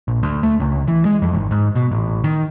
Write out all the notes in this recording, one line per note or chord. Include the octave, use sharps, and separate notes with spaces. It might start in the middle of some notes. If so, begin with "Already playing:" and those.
A#1
D2
A3
C#2
E3
G#3
F2
G#1
G#2
B2
A1
D#3